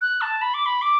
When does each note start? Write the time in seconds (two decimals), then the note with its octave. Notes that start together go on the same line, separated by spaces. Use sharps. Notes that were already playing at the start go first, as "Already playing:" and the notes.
0.01 F#6
0.21 A5
0.41 B5
0.54 D6
0.66 B5
0.82 D6